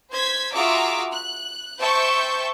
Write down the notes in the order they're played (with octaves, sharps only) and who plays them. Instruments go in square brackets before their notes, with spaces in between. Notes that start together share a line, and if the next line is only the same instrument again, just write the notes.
[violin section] C5 G#6 B6
F4 F#4 G#4 E5 A#5 D6
F#6
C5 E5 G5 A5 C#6 G6